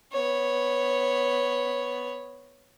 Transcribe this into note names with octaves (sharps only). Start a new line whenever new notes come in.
B3 C#5